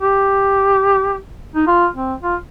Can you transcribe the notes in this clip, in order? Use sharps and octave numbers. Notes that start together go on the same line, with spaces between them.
G4
D#4
F4
C4
F4